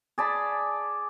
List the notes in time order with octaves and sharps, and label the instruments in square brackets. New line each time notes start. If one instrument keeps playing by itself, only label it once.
[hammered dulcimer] G#4 D5 A5 B5